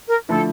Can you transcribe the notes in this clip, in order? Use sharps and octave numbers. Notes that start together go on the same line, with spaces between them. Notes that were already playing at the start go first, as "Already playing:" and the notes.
A#4
D3 F3 A3 E4 A4